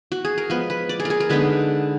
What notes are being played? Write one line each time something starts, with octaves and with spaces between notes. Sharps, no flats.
F#4
G#4
A#4
F3 G#3 B3 B4
B4
D5
G#4
A#4
G#4
A#4
D3 G#3 B3 D#4 B4